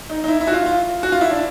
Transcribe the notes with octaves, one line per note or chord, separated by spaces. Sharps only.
D#4
D#4
E4
E4
F#4
F4
F4
F#4
F4
E4
D4